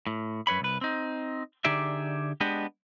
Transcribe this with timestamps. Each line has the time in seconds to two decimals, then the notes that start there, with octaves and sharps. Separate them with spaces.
0.07 A2
0.47 F#2 B4 C#5 B5
0.61 C2 B4
0.81 C4 D#4
1.65 D3 D#4 G4 G#4 D5 E5
2.41 G#3 B3 D4 G4 D#5